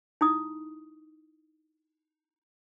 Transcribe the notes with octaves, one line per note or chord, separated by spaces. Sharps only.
D#4 E4 D#6